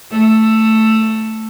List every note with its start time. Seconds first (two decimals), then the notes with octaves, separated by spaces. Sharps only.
0.11 A3